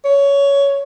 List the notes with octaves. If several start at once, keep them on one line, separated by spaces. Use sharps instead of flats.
C#5